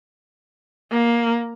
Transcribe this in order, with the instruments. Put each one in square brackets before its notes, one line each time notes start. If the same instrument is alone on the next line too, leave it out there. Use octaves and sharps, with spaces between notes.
[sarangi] A#3